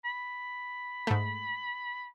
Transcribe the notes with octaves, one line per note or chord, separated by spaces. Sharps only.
B5
G#2 A3